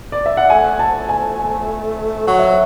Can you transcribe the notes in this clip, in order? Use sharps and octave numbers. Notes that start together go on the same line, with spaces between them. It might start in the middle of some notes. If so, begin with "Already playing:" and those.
D5
E5
F#5
A3 G#5
A5
G#5
G#5
F#3 F#5
E5